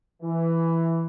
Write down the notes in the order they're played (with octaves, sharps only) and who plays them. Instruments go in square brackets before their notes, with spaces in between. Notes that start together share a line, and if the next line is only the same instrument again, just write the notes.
[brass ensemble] E3